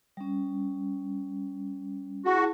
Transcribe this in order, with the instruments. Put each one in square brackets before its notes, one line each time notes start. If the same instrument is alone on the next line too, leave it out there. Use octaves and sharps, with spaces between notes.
[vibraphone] G3 C#4
[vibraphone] E4 G#4 A5 [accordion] F#4